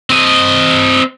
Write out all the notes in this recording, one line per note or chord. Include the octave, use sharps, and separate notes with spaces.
C4 D#5